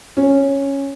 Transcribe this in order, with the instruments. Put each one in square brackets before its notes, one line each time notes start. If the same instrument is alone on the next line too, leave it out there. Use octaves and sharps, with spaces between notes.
[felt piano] C#4